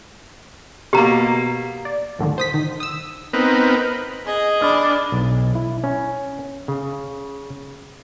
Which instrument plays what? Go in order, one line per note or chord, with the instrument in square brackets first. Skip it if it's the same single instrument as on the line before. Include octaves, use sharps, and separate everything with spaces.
[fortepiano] B2 A#3 [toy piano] G4 A#5
[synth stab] D5
D#2 A2 D3 D#3
C5 D#6 B6
D#3
D#6 E6
[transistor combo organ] B3 C4 D#4 A#4 B4
[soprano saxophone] G#4 [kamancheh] D#5
[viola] D4 [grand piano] B5 F6
[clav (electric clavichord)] B1
E4
C#4
C#3